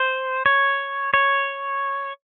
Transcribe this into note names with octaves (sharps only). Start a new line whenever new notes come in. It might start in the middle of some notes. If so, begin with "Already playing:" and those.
Already playing: C5
C#5
C#5